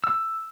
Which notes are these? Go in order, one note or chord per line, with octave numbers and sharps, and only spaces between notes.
E6